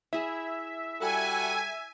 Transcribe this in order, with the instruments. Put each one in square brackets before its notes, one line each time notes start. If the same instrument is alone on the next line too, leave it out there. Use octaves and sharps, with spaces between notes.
[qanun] E4 G#4 [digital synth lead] E5
[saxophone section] G3 F#4 A4 [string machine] G#5